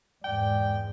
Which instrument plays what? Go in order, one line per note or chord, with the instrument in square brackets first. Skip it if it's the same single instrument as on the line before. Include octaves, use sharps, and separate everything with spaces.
[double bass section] E2 G#2 G#3 [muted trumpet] D5 [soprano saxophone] G5